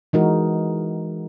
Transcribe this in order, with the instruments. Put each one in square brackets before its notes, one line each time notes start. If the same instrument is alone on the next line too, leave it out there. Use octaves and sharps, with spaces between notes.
[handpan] E3 G#3 D#4 F#4 A#4